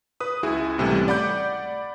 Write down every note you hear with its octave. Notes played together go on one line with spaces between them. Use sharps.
B4 D#6
C#2 E4 F#4 G#4
C#2 A2 C3 E3 G3 A3
D5 F#5 B5 D6 G6